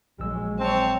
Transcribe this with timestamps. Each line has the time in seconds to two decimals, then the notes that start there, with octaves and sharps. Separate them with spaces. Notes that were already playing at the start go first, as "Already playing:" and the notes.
0.20 A#1 F#3 G#3 E6
0.59 C4 C#5 A5